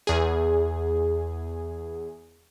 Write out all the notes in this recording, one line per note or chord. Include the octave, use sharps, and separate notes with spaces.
E2 G#4